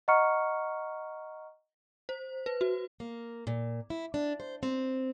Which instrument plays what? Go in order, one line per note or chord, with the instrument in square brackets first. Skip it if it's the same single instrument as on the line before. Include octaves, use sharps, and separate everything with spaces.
[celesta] D#5 F#5 A#5 C#6 F6 C#7
[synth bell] C5
B4
F#4
[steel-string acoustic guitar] A#3
A#2
E4
D4
C5
C4